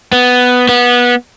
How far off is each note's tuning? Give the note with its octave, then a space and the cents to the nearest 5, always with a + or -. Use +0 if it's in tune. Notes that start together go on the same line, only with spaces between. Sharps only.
B3 +5
B3 -20